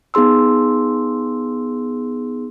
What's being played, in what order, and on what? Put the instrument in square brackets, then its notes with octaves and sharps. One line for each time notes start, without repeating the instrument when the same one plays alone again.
[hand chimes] B3 D#4 G#4 C6 E6